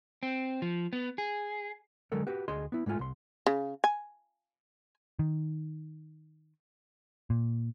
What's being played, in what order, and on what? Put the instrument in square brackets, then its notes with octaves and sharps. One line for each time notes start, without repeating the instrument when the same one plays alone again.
[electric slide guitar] C4
F3
B3
G#4
[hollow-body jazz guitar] D3 F#3 G#3 A4 A#4
F#4 G4 B4
D2 G#4 D#5 C6
B3 E4
G#2 G#3 A3 F4 G#5
C2 C6
[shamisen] C#3
G#5
[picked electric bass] D#3
A#2